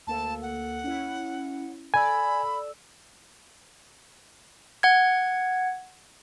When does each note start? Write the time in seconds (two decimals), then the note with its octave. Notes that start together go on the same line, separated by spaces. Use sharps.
0.07 D2 A#3 A4 A5
0.42 F#5
0.84 C#4 E4
1.94 A4 D5 G#5 B5 E6
4.83 F#5 G#6